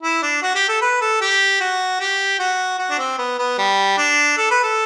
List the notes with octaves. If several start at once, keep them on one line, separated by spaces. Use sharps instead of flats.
E4
D4
F#4
G4
A4
B4
A4
G4
F#4
G4
F#4
F#4
D4
C4
B3
B3
G3
D4
A4
B4
A4